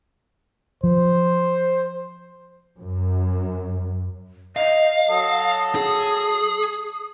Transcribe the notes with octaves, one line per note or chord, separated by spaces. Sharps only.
F3 C5
F#2
D#5 F5
F#3 A4 D#6
G#4